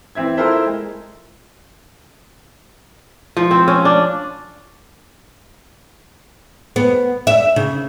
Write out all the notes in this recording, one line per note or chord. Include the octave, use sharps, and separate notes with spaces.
E3 C4 E5 G#6
E4 F4 A4 A#4 C5 E5
G#3
F3
C4
C#4
D4
B3
E5
C#3